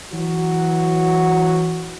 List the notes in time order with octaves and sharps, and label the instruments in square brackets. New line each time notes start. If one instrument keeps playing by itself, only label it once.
[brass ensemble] E3 F#3 F#4